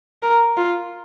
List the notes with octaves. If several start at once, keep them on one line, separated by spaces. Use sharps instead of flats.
A#4
F4